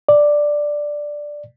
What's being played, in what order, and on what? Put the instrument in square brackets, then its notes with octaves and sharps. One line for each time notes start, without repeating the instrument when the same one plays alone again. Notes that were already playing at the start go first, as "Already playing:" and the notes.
[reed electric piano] D5